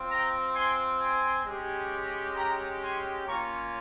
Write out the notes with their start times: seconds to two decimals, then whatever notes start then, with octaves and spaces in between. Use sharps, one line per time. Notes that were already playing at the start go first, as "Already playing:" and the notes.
Already playing: C4 F4
0.10 G5 A#5
0.55 G#5 C6
1.01 G#5 C6
1.46 G#3 C#4 G4
2.36 G5 A#5
2.81 G#5 C6
3.27 A#3 C#4 F4 A#5 C#6